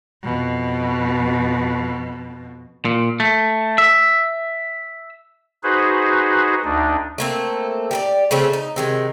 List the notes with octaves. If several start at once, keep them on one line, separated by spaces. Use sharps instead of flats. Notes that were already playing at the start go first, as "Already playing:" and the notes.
F2 B2
A#2
A3
E5
D#4 F#4 G#4 B4 C5
D2 D4 D#4
A3 A#3 C4
G4 A#4 D5
C#3 A3 C4 C#4
D#4
C3 D#3 G#3